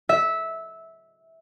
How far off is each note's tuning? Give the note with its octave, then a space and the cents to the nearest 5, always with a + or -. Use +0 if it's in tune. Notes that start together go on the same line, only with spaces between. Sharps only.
E5 -15